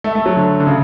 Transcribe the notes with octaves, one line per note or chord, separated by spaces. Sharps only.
A3
A3
F#3
D3
D3
C#3